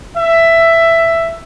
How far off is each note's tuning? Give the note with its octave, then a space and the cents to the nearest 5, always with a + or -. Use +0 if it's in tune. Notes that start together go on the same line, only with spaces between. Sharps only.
E5 +10